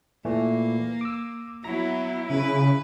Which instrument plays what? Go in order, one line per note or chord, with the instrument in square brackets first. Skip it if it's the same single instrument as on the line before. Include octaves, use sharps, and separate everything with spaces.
[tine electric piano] A#2 E3 A3 [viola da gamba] A#3
[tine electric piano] D6 E6
[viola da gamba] F#3 B3 [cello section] E4 [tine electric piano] A#5 A#6
[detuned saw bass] C#3 [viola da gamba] B4